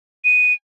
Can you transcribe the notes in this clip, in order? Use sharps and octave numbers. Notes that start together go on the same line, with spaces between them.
D#7